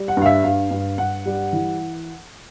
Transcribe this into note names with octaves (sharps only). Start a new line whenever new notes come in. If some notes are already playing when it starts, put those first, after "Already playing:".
Already playing: G3
F#5
G2 F5
E5
G2 F5
G2
G2 F#5
G3
E3